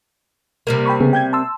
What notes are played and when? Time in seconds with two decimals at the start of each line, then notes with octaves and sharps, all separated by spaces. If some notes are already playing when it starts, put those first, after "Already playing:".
0.67 C3 G3 A#3
0.86 G5 B5 C#6
1.00 C#3 B3 G#4
1.13 G5 G6 G#6
1.33 A5 C6 E6